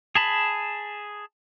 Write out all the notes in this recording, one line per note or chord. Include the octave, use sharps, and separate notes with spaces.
G#4 A5 B5